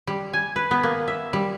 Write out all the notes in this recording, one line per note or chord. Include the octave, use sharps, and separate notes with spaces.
G3
G#5
B4
B3
A#3
E5
G3